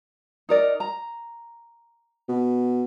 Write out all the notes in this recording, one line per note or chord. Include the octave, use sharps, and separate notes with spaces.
D#4 A#4 D5
A#5
B2